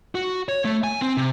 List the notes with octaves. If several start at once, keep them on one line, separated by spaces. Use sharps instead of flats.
F#4
C#5
A3
G#5
C4
C3